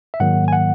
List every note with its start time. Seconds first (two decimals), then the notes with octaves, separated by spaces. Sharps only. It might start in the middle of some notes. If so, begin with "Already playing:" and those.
0.14 E5
0.20 G#2 D#3 F#3 A#3 F#5
0.48 G#5
0.53 F#5